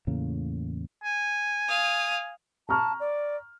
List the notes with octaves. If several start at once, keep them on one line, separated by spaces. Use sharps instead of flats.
E2 A2 C#3 A#3
G#5
F5 D#6
A5 A#5 C#6 F6
D5